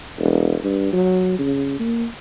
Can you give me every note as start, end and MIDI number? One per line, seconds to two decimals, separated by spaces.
0.18 0.55 28
0.63 0.92 43
0.93 1.36 54
1.39 1.77 49
1.79 2.05 58